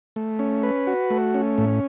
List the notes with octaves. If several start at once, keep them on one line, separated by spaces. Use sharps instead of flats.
A3
C#4
B4
F#4
A3
C#4
A2